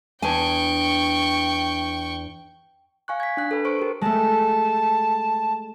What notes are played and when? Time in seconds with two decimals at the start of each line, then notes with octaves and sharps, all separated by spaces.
0.22 E2 D4 G5 G#5 C#6
3.08 F5 G#5 C#6 F#6
3.20 G#6 B6
3.37 D4 F#6
3.51 A4 B4
3.65 C5 C#6 D7
3.79 G4 A#4
4.01 G#3 A3 A5